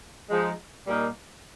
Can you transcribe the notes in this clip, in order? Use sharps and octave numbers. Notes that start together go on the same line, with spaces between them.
F3 G#3 D#4
A#2 G3 A#3 D#4